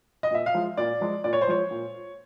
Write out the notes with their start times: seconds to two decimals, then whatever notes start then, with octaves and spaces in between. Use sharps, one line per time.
0.23 D#5
0.31 A#2 E5
0.46 F5
0.54 F3 G#3
0.77 A#2 D5
1.01 F3 G#3
1.24 A#2 D5
1.33 C#5
1.41 C5
1.47 F3 G#3 C#5
1.71 A#2